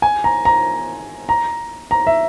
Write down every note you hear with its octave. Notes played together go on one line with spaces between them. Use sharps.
G#5
A#5
A#5
A#5
A#5
E5